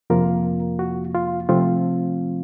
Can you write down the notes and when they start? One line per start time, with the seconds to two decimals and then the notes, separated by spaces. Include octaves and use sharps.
0.10 F2 C3 F3 A#3 F4 A#4
0.79 F#4
1.15 F4
1.49 C3 F3 A3 C4 F4